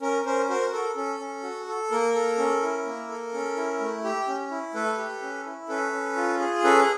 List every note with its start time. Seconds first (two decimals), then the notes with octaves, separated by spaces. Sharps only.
0.01 C#4 A#4
0.25 C#4 A#4 C5
0.49 F#4 A#4 C5
0.72 A4 A#4
0.96 C#4 A4
1.20 C#4
1.43 F#4
1.68 A4
1.90 A#3 A#4
2.14 A4
2.38 C#4
2.62 E4
2.86 A#3
3.09 A4
3.33 C#4
3.57 E4
3.80 A3
4.04 G4
4.27 C#4
4.51 E4
4.74 A3 A4 B4
4.98 G4
5.22 C#4
5.46 E4
5.69 C#4 A4 B4
5.93 C#4
6.16 F4
6.40 G#4
6.64 C#4 A4 B4